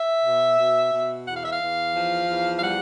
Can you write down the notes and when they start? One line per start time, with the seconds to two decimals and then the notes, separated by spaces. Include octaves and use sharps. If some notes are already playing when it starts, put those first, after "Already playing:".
Already playing: E5
0.24 B2
0.57 B2
0.92 B2
1.25 E2 F#5
1.35 F5
1.43 E5
1.51 F5
1.60 E2
1.94 F3
2.28 E2
2.57 F5
2.62 G3 F#5